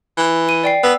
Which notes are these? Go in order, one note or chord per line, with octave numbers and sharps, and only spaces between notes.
E3
D#7
D5 G5 C7
B3 E6